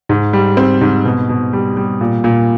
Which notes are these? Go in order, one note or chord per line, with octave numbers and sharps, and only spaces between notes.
G#2
G3
C4
G#2
B2
B2
G3
G3
A#2
A#2